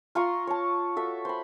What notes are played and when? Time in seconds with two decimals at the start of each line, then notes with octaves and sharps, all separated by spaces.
0.15 F4 A#5 C6 C#6
0.47 C#5 A5
0.96 F#4 A4 E5
1.25 C5 B5